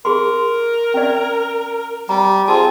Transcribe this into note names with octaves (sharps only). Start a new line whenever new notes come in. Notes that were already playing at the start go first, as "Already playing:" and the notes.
G#4 A#4 C6
C#4 D5
G3 A#5
C4 F4 G#4 A5